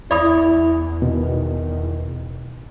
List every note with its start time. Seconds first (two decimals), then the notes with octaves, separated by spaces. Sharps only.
0.11 E2 E4 D5 B5 D#6
1.02 B2 D#3